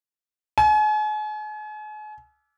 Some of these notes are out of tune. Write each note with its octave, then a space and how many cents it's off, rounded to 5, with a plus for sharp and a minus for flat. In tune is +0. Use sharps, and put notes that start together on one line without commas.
G#5 +40